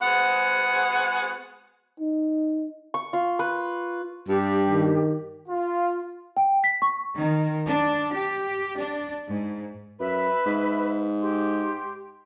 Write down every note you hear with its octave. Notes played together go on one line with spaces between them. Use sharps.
G#3 B3 C4 F#4 G#4 F#5
D#4
C#6
F4
B4
G2 G4
D#3
F4
G5
B6
C#6
D#3
D4
G4
D4
G#2
F#2 B4 E5 B5
G#2
G4 C6